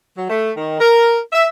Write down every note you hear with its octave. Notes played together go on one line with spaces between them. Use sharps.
F#3
A3
D#3
A#4
E5